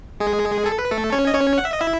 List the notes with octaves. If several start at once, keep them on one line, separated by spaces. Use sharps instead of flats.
G#3 G#4
A4
B4
A3 A4
C#4 C#5
D#5
C#4 C#5
F#5
E5
D#5
E4 E5